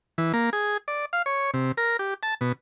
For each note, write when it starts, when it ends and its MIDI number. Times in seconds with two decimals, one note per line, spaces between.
0.18 0.32 52
0.33 0.50 58
0.53 0.77 68
0.88 1.05 74
1.13 1.22 77
1.26 1.51 73
1.54 1.72 48
1.77 1.97 70
1.99 2.14 67
2.23 2.34 81
2.41 2.52 47